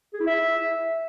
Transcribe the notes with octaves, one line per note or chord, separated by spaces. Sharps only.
G#4
E4
E5